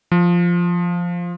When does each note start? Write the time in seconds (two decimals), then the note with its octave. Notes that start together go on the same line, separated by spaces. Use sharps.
0.12 F3